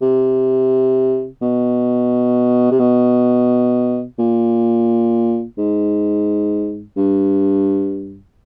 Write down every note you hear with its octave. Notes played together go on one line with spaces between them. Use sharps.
C3
B2
C3
B2
A#2
G#2
G2